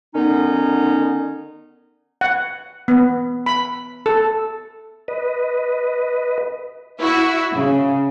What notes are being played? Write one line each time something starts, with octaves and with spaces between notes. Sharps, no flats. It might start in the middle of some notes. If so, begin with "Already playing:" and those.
D3 D#3 B3 C#4 D#4
F#5
B3
B5
A4
B4 D#5
E4 F#4 E5
C#3